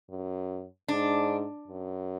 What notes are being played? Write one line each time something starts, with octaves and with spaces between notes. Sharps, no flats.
F#2
G#2 D4
F#2